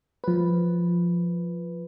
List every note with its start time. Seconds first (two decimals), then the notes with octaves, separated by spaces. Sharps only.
0.24 F3 B4